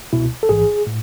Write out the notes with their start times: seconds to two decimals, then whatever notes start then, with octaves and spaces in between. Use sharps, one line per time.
0.13 C#2 B2 E4
0.43 A4
0.49 A1 G#2 E3 G#4
0.87 A2